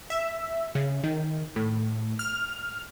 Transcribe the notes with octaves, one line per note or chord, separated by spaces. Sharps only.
E5
C#3
D#3
A2
F6